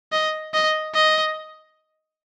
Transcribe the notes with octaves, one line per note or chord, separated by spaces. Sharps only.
D#5
D#5
D#5